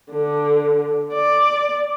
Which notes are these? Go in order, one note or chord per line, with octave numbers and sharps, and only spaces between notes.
D3
D5